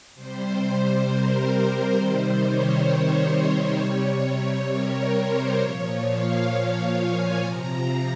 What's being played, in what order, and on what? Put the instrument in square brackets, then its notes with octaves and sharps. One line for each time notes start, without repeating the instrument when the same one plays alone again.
[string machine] C3 G3 C5
A#4
C5
C3 D#3 G3 C5
C#5
C3 G3
A#4
C5
A#2 F3 C#5
F5
F5
G#5
C3 F3 A#5